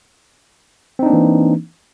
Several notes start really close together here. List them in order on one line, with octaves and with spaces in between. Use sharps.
C4 D#4 D4 A#3 E3